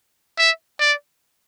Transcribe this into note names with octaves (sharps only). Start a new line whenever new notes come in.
E5
D5